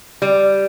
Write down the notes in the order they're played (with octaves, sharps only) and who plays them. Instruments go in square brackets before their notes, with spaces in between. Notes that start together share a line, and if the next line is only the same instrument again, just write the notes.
[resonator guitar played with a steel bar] G3